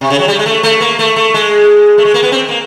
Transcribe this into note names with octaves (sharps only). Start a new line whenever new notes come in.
C3
C#3
F#3
G3
G#3
A3
A3
A#3
A3
A3
G#3
A3
G#3
A#3
B3
C4
A#3